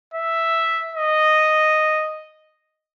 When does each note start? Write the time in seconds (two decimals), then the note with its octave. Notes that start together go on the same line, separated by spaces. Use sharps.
0.14 E5
0.95 D#5